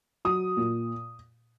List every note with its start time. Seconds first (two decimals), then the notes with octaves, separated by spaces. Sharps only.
0.25 F#3 D#6
0.57 A#2